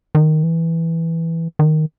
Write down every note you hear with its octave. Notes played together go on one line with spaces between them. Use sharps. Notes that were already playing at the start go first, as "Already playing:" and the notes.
D#3
E3
D#3